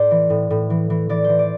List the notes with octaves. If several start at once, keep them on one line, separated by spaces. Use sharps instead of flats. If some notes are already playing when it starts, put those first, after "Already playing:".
Already playing: A2 C5 D5
E3
A2
A2
E3
E3
E3 D5
C5
E3
D5